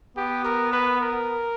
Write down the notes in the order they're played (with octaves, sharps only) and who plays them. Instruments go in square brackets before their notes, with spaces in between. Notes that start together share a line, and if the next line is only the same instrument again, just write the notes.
[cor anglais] B3 [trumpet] G4
[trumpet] A#4
B4
A#4